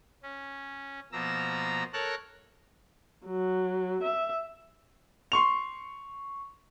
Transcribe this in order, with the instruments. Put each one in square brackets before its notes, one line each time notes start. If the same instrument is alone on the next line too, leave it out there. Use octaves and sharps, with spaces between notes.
[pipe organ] C#4
B2 F3 A#3 A#5 E6
A4 A#4 C#5 A5 A#5 F#6
[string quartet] F#3
E5
[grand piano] C6 C#6 F7